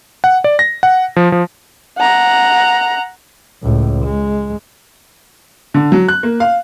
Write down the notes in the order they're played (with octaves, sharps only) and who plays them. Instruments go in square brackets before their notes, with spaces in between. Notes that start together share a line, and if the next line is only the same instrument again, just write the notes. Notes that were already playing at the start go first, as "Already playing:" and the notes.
[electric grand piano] F#5
D5
A#6
F#5
F3
F3
[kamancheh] F#5 A#5
[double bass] C#2 A2
G#3
[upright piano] D3
F#3
F#6
A#3
F5